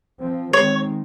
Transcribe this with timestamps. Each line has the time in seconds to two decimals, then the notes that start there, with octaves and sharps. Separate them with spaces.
0.20 F3 C4
0.53 D#3 G#3 C4 C#5